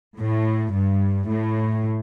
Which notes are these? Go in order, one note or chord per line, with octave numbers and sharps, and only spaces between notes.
A2
G2
A2